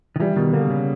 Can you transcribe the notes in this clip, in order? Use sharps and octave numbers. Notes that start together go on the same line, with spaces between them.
D#3
E3 G3
B2 D#3
D3 A#3
C#3